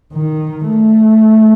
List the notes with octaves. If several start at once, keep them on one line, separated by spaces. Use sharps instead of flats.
D#3
A3